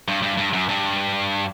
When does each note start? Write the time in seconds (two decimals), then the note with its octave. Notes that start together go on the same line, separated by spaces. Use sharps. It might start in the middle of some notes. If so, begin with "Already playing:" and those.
0.08 G2
0.23 G2
0.38 G2
0.53 F#2
0.69 G2